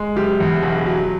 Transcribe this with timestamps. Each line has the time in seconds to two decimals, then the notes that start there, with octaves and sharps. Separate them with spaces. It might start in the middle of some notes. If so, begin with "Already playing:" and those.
Already playing: G#3
0.16 F#1 G4
0.40 E2
0.63 E1
0.86 F#3